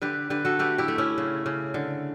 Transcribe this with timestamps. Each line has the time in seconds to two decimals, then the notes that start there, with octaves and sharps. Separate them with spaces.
0.02 D3 G4 B4
0.30 D3 G4 B4
0.45 F#4 A4
0.59 A3 G4 B4
0.78 E4 G4
0.88 A3
0.98 C#4 E4
1.18 C#3
1.46 C#3
1.74 D3